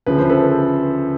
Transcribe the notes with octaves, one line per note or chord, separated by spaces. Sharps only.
D2 C#3 F3 B4
C5
A4 B4